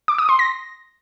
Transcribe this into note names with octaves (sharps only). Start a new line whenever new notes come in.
D6
D#6
C6
A#6